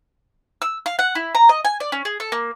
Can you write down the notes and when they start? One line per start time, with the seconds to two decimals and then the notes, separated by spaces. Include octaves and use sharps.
0.62 E6
0.86 F5
0.99 F#5
1.15 E4
1.35 A#5
1.49 D#5
1.65 G#5
1.80 D5
1.92 C#4
2.05 G#4
2.20 A4
2.32 A#3